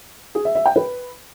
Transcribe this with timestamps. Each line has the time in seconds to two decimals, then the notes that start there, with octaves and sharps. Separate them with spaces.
0.35 G#4
0.45 E5
0.55 E5
0.66 G5
0.76 B4